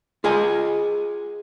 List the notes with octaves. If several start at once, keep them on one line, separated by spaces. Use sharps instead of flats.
F4 G#4 D#5 G#5